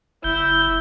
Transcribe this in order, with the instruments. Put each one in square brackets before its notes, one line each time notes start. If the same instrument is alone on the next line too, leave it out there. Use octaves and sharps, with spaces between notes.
[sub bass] F#1 [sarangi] E4 [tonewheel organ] G6